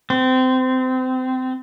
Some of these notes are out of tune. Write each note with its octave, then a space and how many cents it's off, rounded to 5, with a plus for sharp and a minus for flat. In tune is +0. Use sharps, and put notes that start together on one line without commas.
C4 -25